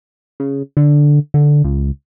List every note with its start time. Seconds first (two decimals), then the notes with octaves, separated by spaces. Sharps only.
0.40 C#3
0.77 D3
1.34 D3
1.64 C#2